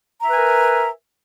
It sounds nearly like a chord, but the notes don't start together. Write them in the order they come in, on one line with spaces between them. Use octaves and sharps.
A#5 E5 B4 G#5 A#4